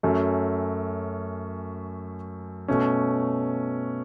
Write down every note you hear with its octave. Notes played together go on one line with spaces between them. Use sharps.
F#2 F#3 A3 C#4
B2 A3 C#4